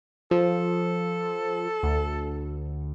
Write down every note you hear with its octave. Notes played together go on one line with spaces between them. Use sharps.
F3 A4
D2